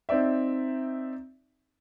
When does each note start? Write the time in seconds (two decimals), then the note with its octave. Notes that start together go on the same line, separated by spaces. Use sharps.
0.09 C4 D#4 D5 E5